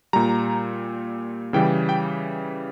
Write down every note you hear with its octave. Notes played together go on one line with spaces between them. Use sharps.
A#2 G3 A#5
C#3 E3 G3 G5
G5